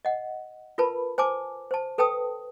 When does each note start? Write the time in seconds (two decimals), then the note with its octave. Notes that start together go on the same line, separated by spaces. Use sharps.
0.05 D#5 F#5
0.78 F4 A#4 B4 A5 B5
1.18 C5 G#5 A5 D6
1.71 C5 A5
1.98 A4 B4 G5 A5 D#6